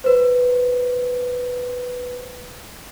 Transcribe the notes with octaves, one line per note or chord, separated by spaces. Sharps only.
B4 C5